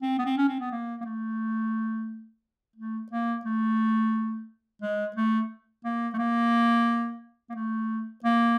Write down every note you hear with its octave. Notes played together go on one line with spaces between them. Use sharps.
C4
B3
C4
C#4
C4
B3
A#3
A#3
A3
A3
A#3
A3
G#3
A3
A#3
A3
A#3
A#3
A3
A#3